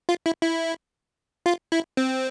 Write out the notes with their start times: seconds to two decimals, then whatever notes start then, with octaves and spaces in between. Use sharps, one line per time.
0.09 F4
0.26 E4
0.42 E4
1.46 F4
1.72 E4
1.97 C4